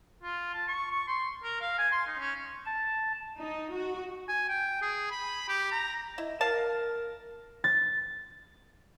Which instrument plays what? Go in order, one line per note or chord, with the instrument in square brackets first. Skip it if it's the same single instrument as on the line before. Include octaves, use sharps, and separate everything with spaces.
[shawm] F4
A5
C#6
C#6
C6
A#4
F5
G#5
C6
D#4
C#4
[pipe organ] A5
[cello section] D#4
F#4
[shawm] G#5
G5
G#4
B5
G4
A#5
[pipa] E4 [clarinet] D#5
[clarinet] A#4 [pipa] F5 A5
[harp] A6